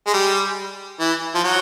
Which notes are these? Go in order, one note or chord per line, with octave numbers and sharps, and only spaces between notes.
G#3
G3
E3
F3
F#3